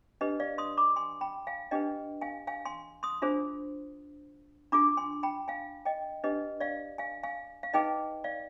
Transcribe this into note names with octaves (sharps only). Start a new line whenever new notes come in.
D4 G4 B4 D#5
D5 F5
C6 D#6
B5 D6
G#5 C6
G5 B5
F5 G#5
D4 G4 B4 D#5 G5
F5 G#5
F5 G#5
G#5 C6
C6 D#6
D4 F4 G#4 C5
D4 F4 G#4 B5 D6
G#5 C6
G5 B5
F5 G#5
D#5 G5
D4 G4 B4 D#5
D5 F5
F5 G#5
F5 G#5
F5
D#4 G#4 B4 D#5 G5
D5 F5